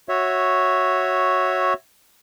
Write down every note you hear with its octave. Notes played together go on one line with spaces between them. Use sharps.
F#4 C#5 E5